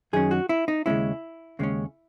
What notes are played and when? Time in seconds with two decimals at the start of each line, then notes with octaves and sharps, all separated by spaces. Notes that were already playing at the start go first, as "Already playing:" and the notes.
0.13 F#2 D#3 F#3 C#4 G#4
0.31 F#4
0.49 E4
0.68 D#4
0.86 D#2 C#3 G#3 C#4 E4
1.59 D#2 C#3 G#3 C#4